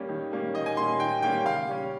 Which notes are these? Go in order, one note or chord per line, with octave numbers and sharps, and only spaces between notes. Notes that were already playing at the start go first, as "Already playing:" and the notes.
Already playing: G3 A#3 C#4
D#3
G3 A#3 C#4
D#3 D#5
G#5
G3 A#3 C#4 C6
D#3 G5
G3 A#3 C#4 G5
C#3 F5
G3 C#4